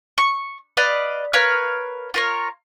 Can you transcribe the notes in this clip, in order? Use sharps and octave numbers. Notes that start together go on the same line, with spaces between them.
C#6
B4 D5 D#5 F5
A#4 B4 C#5 F5
F4 A#4 C#5